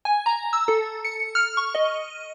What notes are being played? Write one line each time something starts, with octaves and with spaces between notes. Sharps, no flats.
G#5
A#5
E6
A4
C#7
F6
C#6
D#5